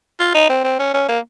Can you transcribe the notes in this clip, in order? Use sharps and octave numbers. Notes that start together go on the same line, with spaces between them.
F4
D#4
C4
C4
C#4
C#4
A#3